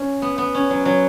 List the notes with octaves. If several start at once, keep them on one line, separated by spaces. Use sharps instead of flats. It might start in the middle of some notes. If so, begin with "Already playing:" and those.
Already playing: C#4
B3
B3
C#4
F#3
F#3